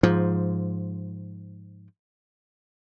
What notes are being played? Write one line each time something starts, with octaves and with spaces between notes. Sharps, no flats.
G#2 F3